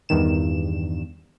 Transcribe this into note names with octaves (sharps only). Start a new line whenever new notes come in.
E2 G2 D#3 E7